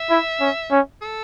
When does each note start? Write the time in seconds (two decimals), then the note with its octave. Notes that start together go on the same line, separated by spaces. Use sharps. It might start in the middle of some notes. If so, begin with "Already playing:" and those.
Already playing: E5
0.10 E4
0.40 C#4
0.71 C#4
1.02 A4